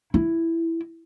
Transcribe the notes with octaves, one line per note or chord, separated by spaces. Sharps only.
E4